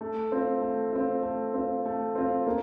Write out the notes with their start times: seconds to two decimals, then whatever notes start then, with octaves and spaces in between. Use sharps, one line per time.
0.01 A3
0.32 C4 F4
0.62 A3
0.92 C4 F4
1.23 A3
1.54 C4 F4
1.85 A3
2.15 C4 F4
2.47 A#3